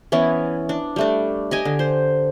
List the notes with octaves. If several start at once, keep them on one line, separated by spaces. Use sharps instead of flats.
E3 B3 C#4 E4
D4
G3 A3 D4
G4 D#5 G#5
D3
C5